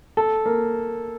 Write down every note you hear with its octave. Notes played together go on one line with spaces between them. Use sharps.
A4
A#3